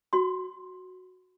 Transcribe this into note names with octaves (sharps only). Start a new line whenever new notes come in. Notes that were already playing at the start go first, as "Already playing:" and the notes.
F#4 C6